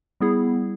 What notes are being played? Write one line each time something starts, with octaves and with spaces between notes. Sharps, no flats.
G3 B3 E4 G#4